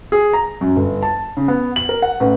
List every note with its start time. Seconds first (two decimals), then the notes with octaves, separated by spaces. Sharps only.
0.12 G#4
0.33 A#5
0.61 F#2
0.76 G1
1.03 A5
1.37 C#3
1.48 B3
1.76 F#7
1.89 A#4
2.02 F#5
2.20 A1